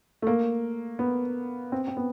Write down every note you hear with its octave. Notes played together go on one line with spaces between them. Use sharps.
A3
A#3
B3
C4
C4
B3